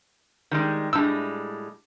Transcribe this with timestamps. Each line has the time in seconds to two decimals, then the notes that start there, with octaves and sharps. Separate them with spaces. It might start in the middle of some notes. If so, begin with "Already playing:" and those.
0.51 D#3 G3 G#3
0.93 A2 G3 G#3 D4 E6